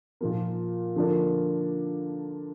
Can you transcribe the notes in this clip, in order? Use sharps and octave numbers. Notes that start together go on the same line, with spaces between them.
A#2 F3 A#3
D3 F3 A#3 D4